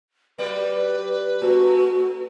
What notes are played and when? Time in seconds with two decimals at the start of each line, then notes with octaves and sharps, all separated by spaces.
0.38 F#3 G3 B4 D5
1.42 A3 F#4